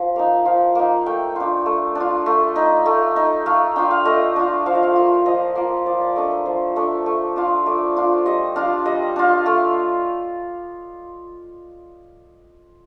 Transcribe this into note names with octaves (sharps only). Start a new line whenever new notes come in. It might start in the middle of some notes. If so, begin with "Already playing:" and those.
Already playing: F3
A#3 D#4 F5
F3 F5
A#3 D#4
A3 G5
D4 F4
A3
D4
F4
A3
D#4
A3
D#4
A3 F5
D4 F4 G5
F5
A3 D#5
D4 F4
F3 F5
D#5
F5
A#3 F4
F3 D#5
A#3 F4
F3 D5
D5
A3 D4 D#5
C5
F3 C5
A3 D4
A3
D4 F4
A3 D5
D4 F4
G3 D#5
D4 F4 F5
G3 D#5
D4 F4
A3 F5